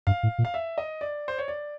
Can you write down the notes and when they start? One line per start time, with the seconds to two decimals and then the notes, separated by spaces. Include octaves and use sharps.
0.07 G2 F5
0.23 A2
0.38 A#2
0.45 F5
0.54 E5
0.78 D#5
1.01 D5
1.28 C5
1.38 C#5
1.48 D5